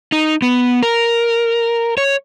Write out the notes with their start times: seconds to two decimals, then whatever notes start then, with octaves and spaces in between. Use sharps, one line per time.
0.12 D#4
0.42 B3
0.83 A#4
1.98 C#5